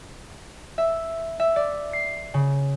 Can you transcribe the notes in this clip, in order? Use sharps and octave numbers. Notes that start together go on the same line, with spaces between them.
E5
E5
D5
C7
C#3